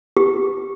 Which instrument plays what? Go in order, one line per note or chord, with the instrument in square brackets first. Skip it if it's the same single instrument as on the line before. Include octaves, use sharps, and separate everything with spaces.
[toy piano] G4